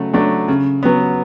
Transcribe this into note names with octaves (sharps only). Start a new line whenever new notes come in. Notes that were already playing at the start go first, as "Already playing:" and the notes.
Already playing: C#3 F#3 A3
F#3 A3 D4
C#3
F#3 B3